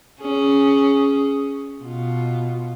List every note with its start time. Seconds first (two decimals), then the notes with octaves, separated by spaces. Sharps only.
0.22 C#4 G#4
1.83 B2 F4